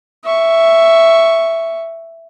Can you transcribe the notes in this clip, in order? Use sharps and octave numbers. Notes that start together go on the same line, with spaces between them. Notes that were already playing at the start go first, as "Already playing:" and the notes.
E5 C#6